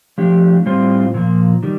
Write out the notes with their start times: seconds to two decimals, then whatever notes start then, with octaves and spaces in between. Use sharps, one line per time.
0.18 F3 A3 D4 G4
0.66 A2 G3 C4 F4 C5
1.14 A#2 F3 A#3
1.63 D#3 G3